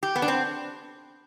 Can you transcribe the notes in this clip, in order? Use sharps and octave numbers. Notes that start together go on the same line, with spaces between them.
G4
B3
D4
C4